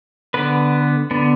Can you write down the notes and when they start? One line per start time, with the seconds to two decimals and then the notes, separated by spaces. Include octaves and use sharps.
0.34 D3 B3 B4
1.11 D3 B3